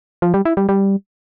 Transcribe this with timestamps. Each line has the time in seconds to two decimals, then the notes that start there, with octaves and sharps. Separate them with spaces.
0.22 F3
0.34 G3
0.45 E4
0.57 G3
0.69 G3